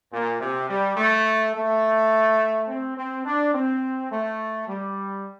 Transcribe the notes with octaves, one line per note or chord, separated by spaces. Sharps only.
A#2
C3
G3
A3
A3
C4
C4
D4
C4
A3
G3